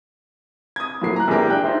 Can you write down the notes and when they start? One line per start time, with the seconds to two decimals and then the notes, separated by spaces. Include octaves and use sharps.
0.76 D#6 G#6
1.02 A2 F3 F#3 A#3 C7
1.16 A#5 F#6
1.28 A#1 E2 F3 G#3 G4 A#4
1.50 D4 G5 F#6
1.64 D#4 F4 G4 C5 E5